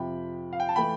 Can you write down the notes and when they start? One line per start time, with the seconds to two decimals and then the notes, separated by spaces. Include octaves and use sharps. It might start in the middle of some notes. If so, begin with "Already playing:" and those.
Already playing: F2 C3 F3 G5 B5
0.53 F5
0.60 G5
0.69 A5
0.76 E3 A3 G5 B5